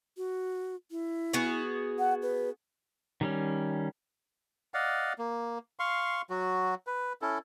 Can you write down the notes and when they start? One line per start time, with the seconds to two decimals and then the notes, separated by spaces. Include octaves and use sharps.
0.17 F#4
0.91 E4
1.33 B3 F#4 G#4
1.99 F#5
2.22 B4
3.21 D#3 G3 C#4
4.74 D5 D#5 F5 F#5
5.18 A#3
5.79 F5 C6 C#6
6.30 F#3 F#4
6.87 B4
7.22 C#4 E4 A4